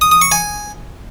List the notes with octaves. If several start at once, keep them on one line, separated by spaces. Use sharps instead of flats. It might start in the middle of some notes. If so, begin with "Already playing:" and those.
D#6
D#6
C#6
G#5